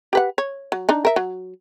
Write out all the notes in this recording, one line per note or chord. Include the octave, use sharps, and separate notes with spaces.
G4 B4 F#5
C#5
F#3
D4 D#4
A#4 E5
F#3